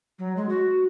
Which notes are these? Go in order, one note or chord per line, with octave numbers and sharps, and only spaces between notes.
F#3
G#3
F#4